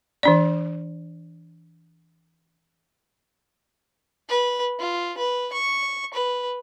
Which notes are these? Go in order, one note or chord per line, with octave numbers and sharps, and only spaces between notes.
E3 D4 D5
B4
F4
B4
C#6
B4